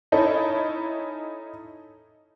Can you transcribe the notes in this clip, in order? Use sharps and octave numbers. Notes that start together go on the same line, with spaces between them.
C#4 D#4 E4 A4 C#5